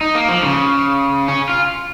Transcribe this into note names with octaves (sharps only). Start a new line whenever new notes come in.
D#4
A#3
F3
C#3
C#4
F4